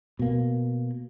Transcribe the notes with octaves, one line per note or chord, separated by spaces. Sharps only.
B2 A#3